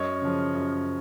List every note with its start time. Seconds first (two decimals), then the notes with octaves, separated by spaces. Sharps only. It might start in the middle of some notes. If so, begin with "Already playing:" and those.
Already playing: F#2 C#5 D#5
0.22 C#3 F3
0.55 F#2